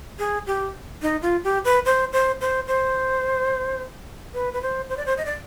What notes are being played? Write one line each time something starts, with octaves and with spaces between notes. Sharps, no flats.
G#4
G4
D#4
F4
G4
B4
C5
C5
C5
C5
B4
B4
C5
C5
D5
C5
D#5
D5